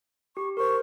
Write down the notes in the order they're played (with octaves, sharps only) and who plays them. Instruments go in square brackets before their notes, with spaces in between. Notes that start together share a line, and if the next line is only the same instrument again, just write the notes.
[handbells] G4 [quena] C#6
[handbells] A#4 C5 [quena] C#6